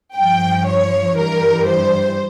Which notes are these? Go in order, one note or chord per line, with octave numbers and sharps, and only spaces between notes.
G2 F3 G5
C#5
G2 E3 G3 A#4
C5